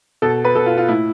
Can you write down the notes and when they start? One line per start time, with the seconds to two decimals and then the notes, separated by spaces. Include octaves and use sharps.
0.22 B2 A4
0.45 B4
0.55 B2 A4
0.66 F4
0.78 F4
0.88 A2 E4